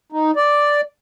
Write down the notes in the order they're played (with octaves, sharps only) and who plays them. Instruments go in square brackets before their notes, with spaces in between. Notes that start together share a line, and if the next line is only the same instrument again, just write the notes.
[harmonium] D#4
D5